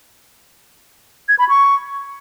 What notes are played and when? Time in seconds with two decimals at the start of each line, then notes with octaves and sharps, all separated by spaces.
1.29 G#6
1.39 B5
1.49 C#6